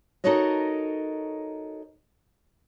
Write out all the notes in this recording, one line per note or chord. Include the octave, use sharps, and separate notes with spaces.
D#4 F#4 A4 A#4 C#5 D#5